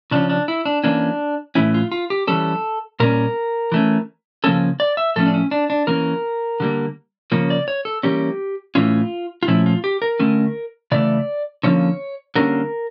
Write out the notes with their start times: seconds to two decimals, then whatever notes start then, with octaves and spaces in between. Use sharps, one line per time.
0.11 C#3 F3 C#4 D4
0.30 D4
0.48 E4
0.65 D4
0.84 E3 A#3 C#4 D4
1.55 A2 E3 A3 C#4 E4
1.74 F4
1.92 F4
2.10 G4
2.27 E3 G3 C#4 A4
3.00 A#2 G3 A#3 C#4 A#4
3.72 E3 A3 C#4
4.44 C#3 F3 A#3 C#4 A4
4.80 D5
4.97 E5
5.16 A2 F3 A3 C#4 A4
5.26 D4
5.34 C#4
5.51 D4
5.70 D4
5.87 E3 A#3 C#4 A#4
6.60 D3 G3 A#3
7.32 C#3 F3 A#3 C#4
7.50 D5
7.68 C#5
7.85 A4
8.03 E3 G3 A#3 C#4 G4
8.75 A2 E3 A3 C#4 F4
9.43 F4
9.47 A#2 F3 A3 C#4 E4
9.66 F4
9.84 G4
10.02 A#4
10.19 D3 A3 C#4
10.92 C#3 E3 A3 D5
11.63 D3 F3 A#3 C#4 C#5
12.35 D3 G3 A#3 C#4 A#4